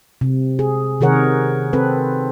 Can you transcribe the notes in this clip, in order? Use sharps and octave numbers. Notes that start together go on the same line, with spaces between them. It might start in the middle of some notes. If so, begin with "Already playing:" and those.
C3
G#4
C3 D#3 G#4 A#4 C#5 F#5
C4 A4 B4